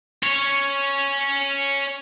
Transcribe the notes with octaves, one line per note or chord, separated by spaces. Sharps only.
C#4 C#5